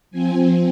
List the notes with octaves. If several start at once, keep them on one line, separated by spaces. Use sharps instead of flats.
F3 C4 G#5